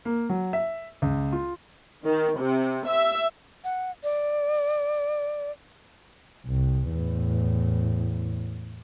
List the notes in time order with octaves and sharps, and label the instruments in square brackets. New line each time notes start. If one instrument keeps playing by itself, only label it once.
[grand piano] A#3
F#3
E5
C#2
F4
[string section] D#3
C3
E5
[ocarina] F#5
D5
[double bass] C2
E2 A2